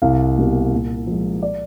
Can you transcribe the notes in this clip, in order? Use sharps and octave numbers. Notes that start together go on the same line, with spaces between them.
C2 F5
B2 G3 A#3
A#2
F3 G#3
D5